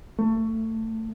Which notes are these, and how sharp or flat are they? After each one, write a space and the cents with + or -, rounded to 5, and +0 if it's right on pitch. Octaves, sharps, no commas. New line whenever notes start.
A3 +20